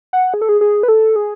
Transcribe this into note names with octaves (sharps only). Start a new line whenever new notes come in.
F#5
G#4
A4
G#4
G#4
B4
A4
G#4